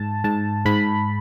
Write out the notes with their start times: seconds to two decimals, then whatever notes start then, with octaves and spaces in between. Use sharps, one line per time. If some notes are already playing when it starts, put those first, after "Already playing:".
Already playing: G#2 A5
0.24 G#2 A5
0.65 G#2 B5